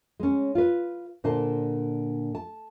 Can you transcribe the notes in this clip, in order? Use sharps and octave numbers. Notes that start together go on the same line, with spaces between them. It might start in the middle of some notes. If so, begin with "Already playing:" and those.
G#3 C#4
F4 B4
A#2 D3 C5 A5
A5